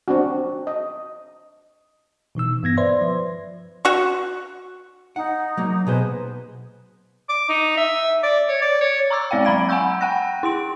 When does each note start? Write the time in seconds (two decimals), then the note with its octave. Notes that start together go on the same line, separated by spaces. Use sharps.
0.08 C4 D4 F#4
0.67 D#5
2.35 B2 E3 D#4 E6
2.63 G2 B3 G#6 A#6
2.77 B4 C5 D5 E5 C6
3.01 F3
3.85 F#4 C#6
5.16 D#4 F#5
5.57 F#3 A#3
5.87 B2 G#4 B4 C5
7.29 D6
7.49 D#4
7.77 E5
8.23 D5
8.48 C#5
8.62 D5
8.81 C#5
9.11 A#5 C#6 D6 E6 A6
9.31 G#3 C4 D5 F5 G5
9.45 F#3 A#5 B5 G#6 D7
9.69 F#5 G#5 B5 C#6 E6 G6
10.01 F#5 G5 F#6 A#6
10.43 E4 C6 D7